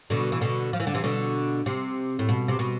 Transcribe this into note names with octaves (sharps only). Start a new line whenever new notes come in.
B2 D3
E3
B2 D3
F3
E3
D3
C3 E3
B2 D3
C3
A2
B2
C3
B2